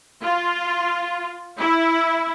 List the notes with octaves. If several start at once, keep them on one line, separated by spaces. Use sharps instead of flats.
F4
E4